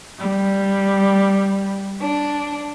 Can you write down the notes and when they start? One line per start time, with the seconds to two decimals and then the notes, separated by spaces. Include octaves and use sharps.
0.19 G3
2.02 D4